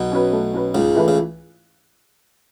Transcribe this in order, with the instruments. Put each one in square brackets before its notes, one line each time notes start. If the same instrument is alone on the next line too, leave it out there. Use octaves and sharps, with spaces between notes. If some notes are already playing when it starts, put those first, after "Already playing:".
Already playing: [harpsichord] B1 B2
[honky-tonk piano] C#4 F#4 B4
A3
C#4 F#4 B4
[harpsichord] C#2 C#3 [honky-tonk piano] G#2
[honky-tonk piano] E3 A3 E4 B4
[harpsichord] C#3